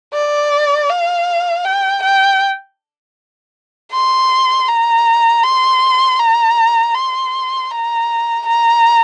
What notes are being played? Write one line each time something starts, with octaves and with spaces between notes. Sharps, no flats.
D5
F5
G5
G5
C6
A#5
C6
A#5
C6
A#5
A#5